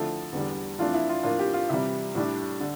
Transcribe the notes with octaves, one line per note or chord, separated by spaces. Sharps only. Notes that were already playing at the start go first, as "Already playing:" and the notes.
Already playing: D3 F3 A3 E4 A4
E2 D3 G3
F2 E3 A3 D4 F4
E4
F4
A2 F3 A#3 D4 F4
G4
F4
C3 E3 G3 E4
A2 G3 D4
D3